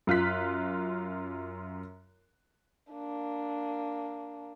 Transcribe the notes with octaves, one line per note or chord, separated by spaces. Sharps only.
F#2 F4 F#6 B6
A#3 D4